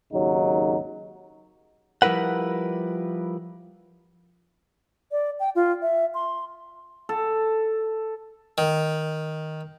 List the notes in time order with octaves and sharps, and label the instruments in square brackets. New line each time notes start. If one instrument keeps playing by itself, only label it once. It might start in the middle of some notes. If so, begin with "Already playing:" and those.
[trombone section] G#1 D#2 C#3 F#3 D#4
[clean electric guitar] F3 G3 E4 A#4 B4 F#5
[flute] D5
G5
F4
E5
C6
[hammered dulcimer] A4
[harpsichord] D#3